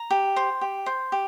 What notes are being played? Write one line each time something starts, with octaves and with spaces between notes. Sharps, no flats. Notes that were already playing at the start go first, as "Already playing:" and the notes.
Already playing: A#5
G4
C5
G4
C5
G4